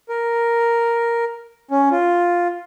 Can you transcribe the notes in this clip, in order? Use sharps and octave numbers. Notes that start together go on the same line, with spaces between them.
A#4
C#4
F4